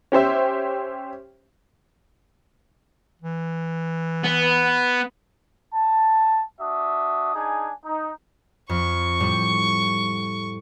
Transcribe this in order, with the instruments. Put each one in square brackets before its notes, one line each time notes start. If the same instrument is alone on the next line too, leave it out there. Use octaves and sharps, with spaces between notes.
[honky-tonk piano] C#4 G4 C5 E5
[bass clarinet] E3
[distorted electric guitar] B3
[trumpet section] A5
D4 F#4 E5 D#6
D4 D#4 G#4 G#5
D#4
[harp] F2 [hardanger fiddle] C#6
[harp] A2 G3